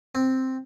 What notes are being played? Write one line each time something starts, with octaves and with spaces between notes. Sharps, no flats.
C4